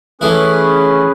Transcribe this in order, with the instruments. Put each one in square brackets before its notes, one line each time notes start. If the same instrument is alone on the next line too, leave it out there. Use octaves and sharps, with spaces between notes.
[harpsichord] E3 A3 E4 [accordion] C#4 G#4 B4